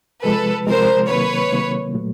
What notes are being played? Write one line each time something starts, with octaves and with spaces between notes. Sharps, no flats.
C3 F3 G#3 A4 B4
C3 F3 G#3 A#4 C5
C3 D#3 F#3 A#3 B4 C#5
C3 D#3 F#3 A#3
A#2 F#3 A3